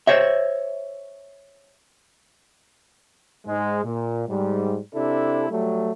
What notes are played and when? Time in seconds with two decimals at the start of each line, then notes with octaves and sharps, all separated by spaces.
0.07 C5 C#5 E5
3.46 G#2 G#3
3.83 A#2
4.28 G#2 G3
4.94 C3 D4 E4 A4
5.50 F#3 G3 A3